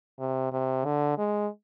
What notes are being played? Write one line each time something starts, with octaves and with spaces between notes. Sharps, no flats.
C3
C3
D3
G#3